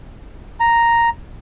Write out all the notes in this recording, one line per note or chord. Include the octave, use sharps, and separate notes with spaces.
A#5